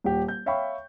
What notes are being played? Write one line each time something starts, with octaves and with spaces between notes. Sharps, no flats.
D#1 G4
G6
C#5 E5 F5 G5 B5 C#6